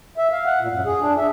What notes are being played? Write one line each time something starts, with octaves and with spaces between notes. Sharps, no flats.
E5
F5
F#5
A#2
F#2
G#4
D4
E5